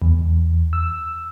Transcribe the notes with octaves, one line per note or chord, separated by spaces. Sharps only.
E2
E6